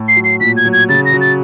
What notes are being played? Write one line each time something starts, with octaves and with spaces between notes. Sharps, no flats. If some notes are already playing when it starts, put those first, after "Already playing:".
Already playing: A2
C7
F#3
C7
A#2 B6
G#6
F#3
G#6
C#3 A6
A#6
F#3
A6